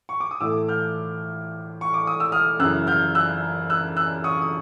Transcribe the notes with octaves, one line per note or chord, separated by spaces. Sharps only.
C#6
D6
D#6
A2 E3 A3 D6 E6
F6 G6
C#6
D6
D#6
E6
D#6 F6
F#2 C#3 E3 E6 F#6
F6 G6
E6 F#6
E6 F#6
E6 F#6
C#6 D#6
D#6